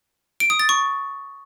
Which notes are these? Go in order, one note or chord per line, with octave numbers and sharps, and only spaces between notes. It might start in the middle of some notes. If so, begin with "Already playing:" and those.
D7
D#6
A6
C#6